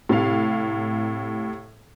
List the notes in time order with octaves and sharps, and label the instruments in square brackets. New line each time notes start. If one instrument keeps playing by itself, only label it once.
[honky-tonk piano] A2 C3 F5